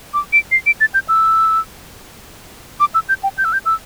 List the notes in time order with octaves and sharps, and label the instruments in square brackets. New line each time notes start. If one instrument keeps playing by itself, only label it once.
[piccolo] D6
D7
C7
D7
A6
G6
E6
D6
E6
G6
G5
G6
E6
G6
E6